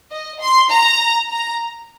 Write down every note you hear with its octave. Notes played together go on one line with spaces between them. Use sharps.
D#5
C6
A#5
A#5